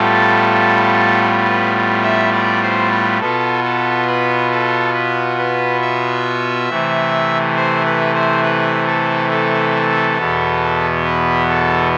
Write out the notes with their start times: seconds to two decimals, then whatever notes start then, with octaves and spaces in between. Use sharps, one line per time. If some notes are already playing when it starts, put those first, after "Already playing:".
Already playing: A2 G3 B3 F4 A4
1.46 B4
2.04 E5
2.33 D5
2.62 C5
2.91 B4
3.20 B2 B3 F4 A4
3.64 A4
4.07 B4
4.51 A4
4.94 B4
5.38 B4
5.82 E5
6.69 C3 E3 A3
7.56 C5
7.85 B4
8.14 C5
8.43 B4
8.86 A4
9.30 A4
10.17 E2 B2 B3
11.04 B4
11.48 A4